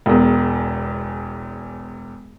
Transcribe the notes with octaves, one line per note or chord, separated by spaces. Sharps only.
E1 E2